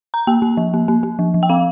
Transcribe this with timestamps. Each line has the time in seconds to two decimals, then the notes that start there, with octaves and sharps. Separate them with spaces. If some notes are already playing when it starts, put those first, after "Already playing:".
0.14 A#5
0.27 A#3 G5
0.42 A#3
0.57 F3
0.74 A#3
0.88 A#3
1.03 A#3
1.19 F3
1.34 F3
1.43 G5
1.49 C4 F5